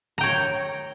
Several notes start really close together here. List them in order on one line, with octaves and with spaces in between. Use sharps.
A#5 G5 C#5